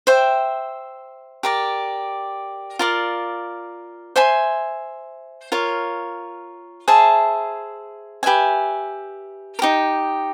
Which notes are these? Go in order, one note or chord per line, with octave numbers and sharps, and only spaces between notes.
C5 E5 G5
G4 A#4 D5
F4 A#4 D5
C5 E5 G#5 C6
F4 A#4 C#5
G#4 C5 E5 A5
G4 B4 E5 G#5
A#4
D#4 G4